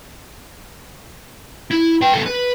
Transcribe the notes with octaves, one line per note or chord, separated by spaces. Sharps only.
E4
B4 G5
B3 A4
B4